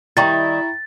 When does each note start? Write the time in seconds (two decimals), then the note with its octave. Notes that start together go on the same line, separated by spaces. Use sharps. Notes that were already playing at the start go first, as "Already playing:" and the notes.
0.17 D#3 G3 E4 G5 A#5 C#6 A6